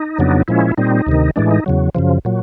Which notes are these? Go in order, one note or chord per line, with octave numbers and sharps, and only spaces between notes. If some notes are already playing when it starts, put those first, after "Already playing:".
Already playing: D#4
F2 C#3 F#3 B3 D4
A#2 F3 G#3 C#4 E4
A#2 G3 C4 D#4
D2 C3 D#3
A2 E3 G#3 D4
D#4
E2 C#3 F#3
F#2 C#3 F3
A#2 F#3